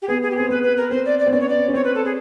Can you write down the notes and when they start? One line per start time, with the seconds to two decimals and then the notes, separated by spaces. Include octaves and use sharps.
0.01 G4
0.07 B3 G#4
0.22 G#4
0.30 G4
0.36 C4 G#4
0.49 B3 B4
0.62 B4
0.76 A#4
0.90 C4 C5
1.05 D5
1.18 D5
1.26 C4
1.31 B3 C#4 D5
1.40 C#5
1.48 D5
1.68 C#4
1.73 C4 C#5
1.84 B4
1.94 A4
2.04 G#4